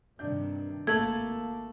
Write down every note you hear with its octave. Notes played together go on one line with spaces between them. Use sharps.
G2 C3 D#3 D4 G6
G#1 A3 A#3 A5 E6 G#6 F#7